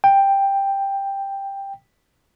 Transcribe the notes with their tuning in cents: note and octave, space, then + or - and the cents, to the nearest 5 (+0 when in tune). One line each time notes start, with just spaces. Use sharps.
G5 +5